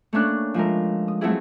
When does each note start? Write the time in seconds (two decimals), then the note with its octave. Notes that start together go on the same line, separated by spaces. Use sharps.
0.13 A3 A#3 C#4 D4 F#6
0.54 F3 G#3 A3 A#4
1.08 D#6
1.21 F#3 A3 B3 C4 E4 G#4